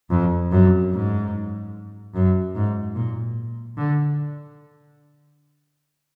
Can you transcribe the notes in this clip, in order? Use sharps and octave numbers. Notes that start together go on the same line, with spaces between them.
F2
F#2
G#2
F#2
G#2
A#2
D3